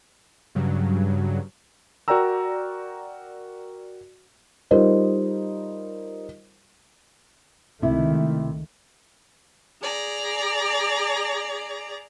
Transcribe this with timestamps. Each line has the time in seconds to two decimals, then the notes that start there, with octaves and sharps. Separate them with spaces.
0.55 G2 C#3 F#3
2.08 F#4 A#4 D5 G5 A#5 E6
4.71 G3 D#4 F4 A#4 C5 D#5
7.82 C#2 C3 D#3 A3 E4
9.82 G#4 D5 A#5